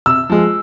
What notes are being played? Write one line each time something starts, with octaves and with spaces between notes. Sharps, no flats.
C3 E6
F3 G#3